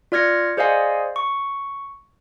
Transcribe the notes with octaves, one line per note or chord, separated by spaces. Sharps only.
F4 D5 F6 G#6 A#6 C#7
G#4 C5 D5 D#5 F5 G#5
C#6